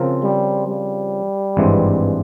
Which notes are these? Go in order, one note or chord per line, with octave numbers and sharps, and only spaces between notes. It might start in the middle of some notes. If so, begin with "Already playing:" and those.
Already playing: C#3 F3 C4 F4 A#4
G3
G3
G#1 G2 E3 G#3 C4